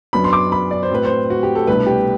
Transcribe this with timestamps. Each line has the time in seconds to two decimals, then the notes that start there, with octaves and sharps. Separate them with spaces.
0.13 F#2 F#3 B3 D4 B5
0.24 C6
0.33 D6
0.52 B5
0.71 D5
0.83 C5
0.91 A2 F#3 C4 B4
1.05 C5
1.30 F#4
1.43 G4
1.55 A4
1.67 C2 B2 A3 D4 B4
1.86 G4